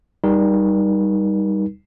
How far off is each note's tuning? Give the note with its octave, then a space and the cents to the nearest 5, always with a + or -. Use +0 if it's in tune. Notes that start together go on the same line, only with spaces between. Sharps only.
G3 +0 D#4 +0 A#4 +35